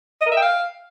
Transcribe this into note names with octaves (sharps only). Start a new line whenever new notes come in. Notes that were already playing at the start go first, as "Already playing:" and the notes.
D#5
A#4
E5
G5
F5